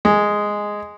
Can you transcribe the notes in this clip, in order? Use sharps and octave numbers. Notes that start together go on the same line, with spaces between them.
G#3